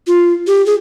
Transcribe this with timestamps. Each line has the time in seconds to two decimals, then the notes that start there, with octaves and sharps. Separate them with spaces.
0.07 F4
0.47 G4
0.66 G#4